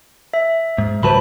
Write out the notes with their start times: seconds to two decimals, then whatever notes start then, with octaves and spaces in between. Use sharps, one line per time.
0.34 E5
0.78 G#2
1.03 C#2 F#3 B4 C5 A5 B5